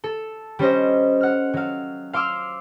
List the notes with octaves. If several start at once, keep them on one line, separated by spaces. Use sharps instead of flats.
A4
G3 C#4 C5 D#5
F#5 F6
F#3 F5
F5 C6 D6 E6 F6